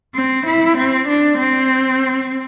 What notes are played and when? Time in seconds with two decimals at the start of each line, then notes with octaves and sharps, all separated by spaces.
0.15 C4
0.46 E4
0.77 C4
1.08 D4
1.39 C4